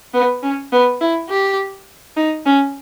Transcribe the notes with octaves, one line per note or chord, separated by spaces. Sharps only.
B3
C#4
B3
E4
G4
D#4
C#4